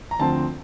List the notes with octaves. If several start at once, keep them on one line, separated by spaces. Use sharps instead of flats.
A#5
D2 D3 F3 C4 A5